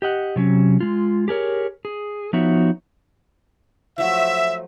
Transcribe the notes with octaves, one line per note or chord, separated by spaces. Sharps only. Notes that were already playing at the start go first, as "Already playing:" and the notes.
G4 D#5 F#5
C3 F#3 C#4
G#3 F4
G4 G#4 A#4 C#5
G#4
F3 B3 D#4 F#4 C#5 E5
F3 F#3 A3 E5